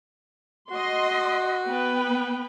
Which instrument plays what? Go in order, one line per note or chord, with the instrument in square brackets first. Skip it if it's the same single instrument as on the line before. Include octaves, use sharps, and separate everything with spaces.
[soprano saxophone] F#4 [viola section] D#5 C6
[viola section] B3 B4 G5